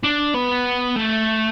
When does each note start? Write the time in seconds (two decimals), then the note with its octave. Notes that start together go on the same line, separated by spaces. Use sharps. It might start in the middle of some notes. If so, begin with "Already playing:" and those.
0.04 D4
0.35 B3
0.96 A3